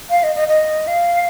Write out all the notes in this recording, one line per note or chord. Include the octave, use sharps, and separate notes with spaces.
F5
D#5
D#5
D#5
F5